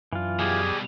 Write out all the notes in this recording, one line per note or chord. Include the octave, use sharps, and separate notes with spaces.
F#2 E3 D4 F4
B2 G3 G4 G#4 G#5